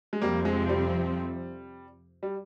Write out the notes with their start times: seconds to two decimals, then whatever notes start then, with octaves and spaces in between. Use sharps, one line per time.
0.13 G#3
0.22 F2 C3 F3 G3 A#3 C4
0.45 G#3
0.69 G3
2.23 G3